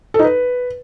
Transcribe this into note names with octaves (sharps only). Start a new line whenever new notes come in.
A4
D#4
B4